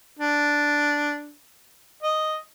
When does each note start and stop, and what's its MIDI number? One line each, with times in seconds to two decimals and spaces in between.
0.19 1.32 62
2.03 2.38 75